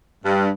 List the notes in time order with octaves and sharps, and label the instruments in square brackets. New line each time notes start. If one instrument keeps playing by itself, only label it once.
[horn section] G2